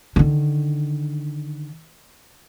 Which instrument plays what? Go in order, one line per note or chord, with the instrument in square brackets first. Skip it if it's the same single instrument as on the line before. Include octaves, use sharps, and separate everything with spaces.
[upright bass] D3 D#3